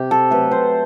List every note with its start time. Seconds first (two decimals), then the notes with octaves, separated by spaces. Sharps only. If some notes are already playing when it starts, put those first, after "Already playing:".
Already playing: C3 G4
0.11 A4
0.31 F#3 A3 B4
0.51 C5